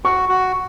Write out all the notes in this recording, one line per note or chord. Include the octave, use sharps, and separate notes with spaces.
F#4 C#6
F#4